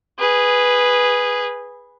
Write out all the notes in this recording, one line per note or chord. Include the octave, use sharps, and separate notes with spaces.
G#4 B4